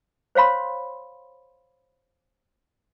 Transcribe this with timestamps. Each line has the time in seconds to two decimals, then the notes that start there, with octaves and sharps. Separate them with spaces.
0.35 C5 C#5 F5 B5 C6